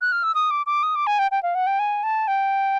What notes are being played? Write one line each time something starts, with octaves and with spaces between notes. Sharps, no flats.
F#6
F6
E6
D#6
D6
D6
D#6
D6
G#5
G5
G5
F5
F#5
G5
G#5
A5
G5